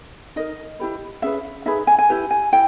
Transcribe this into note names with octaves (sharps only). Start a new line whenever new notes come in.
D#4 A#4 D#5
E4 G4 B4
C#4 G#4 B4 E5
D#4 G#4 B4 E5
G#5
G#5
E4 G4 B4
G#5
E4 G5